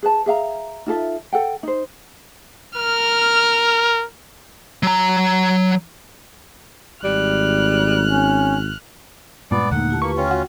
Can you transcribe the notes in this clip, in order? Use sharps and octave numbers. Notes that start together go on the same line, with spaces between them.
G#4 B4 A5
G#4 E5 F5 A#5
D#4 F4 A4 E5
A4 F#5 G5
D#4 C5
A#4 F6
F#3 A#5
G#1 G3 F6 F#6
C#4
G2 A#2 G#3 B3 D5
D#2 D3 A3 A#3 D#4 F#5
E4 G4 A5
A#3 F4 G4 B4 C#6
C#4 F4 G5
F#4